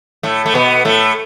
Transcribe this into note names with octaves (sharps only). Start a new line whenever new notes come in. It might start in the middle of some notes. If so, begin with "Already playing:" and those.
A2 A3
A3
B2 B3
A2 A3